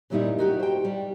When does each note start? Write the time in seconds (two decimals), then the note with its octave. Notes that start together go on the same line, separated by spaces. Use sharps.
0.10 F#2 A#2 D#3 G3 D#4 E4
0.38 D#4 F#4 G4
0.60 C5 G5
0.85 G3